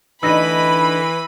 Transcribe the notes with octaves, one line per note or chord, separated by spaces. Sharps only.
D3 E3 A3 D#4 B5 E6 A#6 D#7